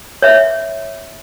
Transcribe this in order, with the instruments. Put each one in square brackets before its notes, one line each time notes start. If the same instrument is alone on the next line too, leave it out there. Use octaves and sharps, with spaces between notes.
[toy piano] C#5 E5